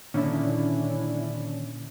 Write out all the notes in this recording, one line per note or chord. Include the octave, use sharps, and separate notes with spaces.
A#2 D3 D#3 C#4 D4 E4